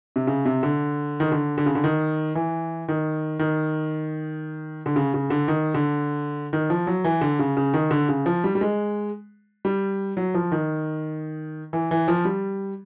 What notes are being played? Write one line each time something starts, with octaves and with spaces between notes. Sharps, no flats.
C3
C#3
C3
D3
D#3
D3
D3
C#3
D3
D#3
E3
D#3
D#3
D3
C#3
C#3
D3
D#3
D3
D#3
F3
F#3
E3
D3
C#3
C#3
D#3
D3
C#3
F3
G3
G3
G#3
G3
F#3
F3
D#3
E3
E3
F3
G3